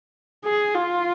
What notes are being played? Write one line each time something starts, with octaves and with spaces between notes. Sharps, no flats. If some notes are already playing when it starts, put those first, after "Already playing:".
G#4
F4